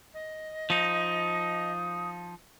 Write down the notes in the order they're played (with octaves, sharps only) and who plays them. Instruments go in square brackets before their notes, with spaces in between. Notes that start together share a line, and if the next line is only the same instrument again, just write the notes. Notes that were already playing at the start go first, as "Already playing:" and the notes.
[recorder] D#5
[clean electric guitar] F3 D#4 [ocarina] D#6